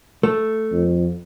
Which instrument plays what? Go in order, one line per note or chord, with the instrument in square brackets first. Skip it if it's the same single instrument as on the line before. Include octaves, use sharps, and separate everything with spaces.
[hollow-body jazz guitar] A3
[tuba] F2